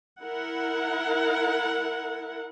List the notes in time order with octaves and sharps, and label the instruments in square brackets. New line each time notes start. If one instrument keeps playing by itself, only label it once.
[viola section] E4 A#4 F#5